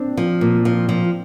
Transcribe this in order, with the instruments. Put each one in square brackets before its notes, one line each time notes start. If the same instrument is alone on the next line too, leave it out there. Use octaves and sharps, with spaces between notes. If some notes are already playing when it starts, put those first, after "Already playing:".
Already playing: [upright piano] C4 D4
[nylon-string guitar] F3
A#2
F3
F3